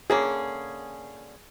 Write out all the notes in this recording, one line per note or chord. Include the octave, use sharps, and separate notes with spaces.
D3 A#3 C#4 G#4